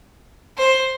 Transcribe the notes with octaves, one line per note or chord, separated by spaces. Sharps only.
C5